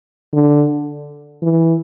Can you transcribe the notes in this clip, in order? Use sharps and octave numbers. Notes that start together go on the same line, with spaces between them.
D3
E3